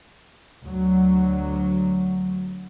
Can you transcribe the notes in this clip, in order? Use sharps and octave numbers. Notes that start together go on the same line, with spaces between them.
D2 F#3